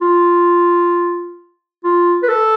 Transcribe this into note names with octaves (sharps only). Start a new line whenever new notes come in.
F4
F4
B4
A4